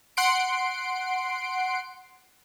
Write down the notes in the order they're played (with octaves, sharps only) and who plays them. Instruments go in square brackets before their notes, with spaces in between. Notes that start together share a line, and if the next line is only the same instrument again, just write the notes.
[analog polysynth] F#5 C6 C7 D7